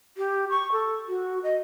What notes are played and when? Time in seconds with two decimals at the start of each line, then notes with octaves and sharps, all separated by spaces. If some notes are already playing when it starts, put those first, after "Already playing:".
0.17 G4
0.50 C#6
0.72 A4
1.08 F#4
1.43 D#5